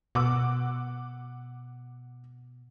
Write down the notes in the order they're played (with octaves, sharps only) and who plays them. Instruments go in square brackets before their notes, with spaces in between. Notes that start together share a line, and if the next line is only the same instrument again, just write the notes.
[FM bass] B2 [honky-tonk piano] F#5 D6 E6